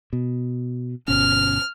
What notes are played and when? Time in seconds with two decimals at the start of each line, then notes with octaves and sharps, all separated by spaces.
0.13 B2
1.08 G1 B2 C#4 F6